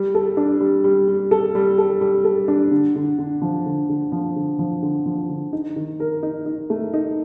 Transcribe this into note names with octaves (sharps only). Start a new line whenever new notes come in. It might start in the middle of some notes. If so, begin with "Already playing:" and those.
Already playing: G3
A4
D4
G3
G3
G3
A4
G3
A4
G3
A4
D4
D3
D3
D3
F3
D3
D3
F3
D3
F3
D3
F3
D3
D#4
D#3
A#4
D#4
D#4
A3
D#4